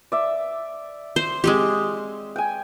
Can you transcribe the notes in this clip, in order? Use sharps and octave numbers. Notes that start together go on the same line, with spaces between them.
D5 E5
C5
G#3 C4 G4
G5 G#5